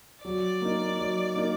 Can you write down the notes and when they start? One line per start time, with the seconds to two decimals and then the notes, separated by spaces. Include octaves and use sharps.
0.25 F#3 D5
0.61 A#3 D#4
0.98 F#3
1.36 A#3 D#4